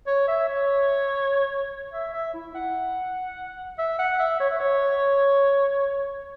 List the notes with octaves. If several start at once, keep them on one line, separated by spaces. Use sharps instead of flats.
C#5
E5
C#5
E5
E5
E4
F#5
E5
F#5
E5
C#5
E5
C#5